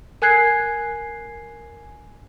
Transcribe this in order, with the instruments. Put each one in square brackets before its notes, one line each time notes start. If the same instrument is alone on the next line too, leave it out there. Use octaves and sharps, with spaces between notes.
[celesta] A#4 G#5 F#6 G#6 C7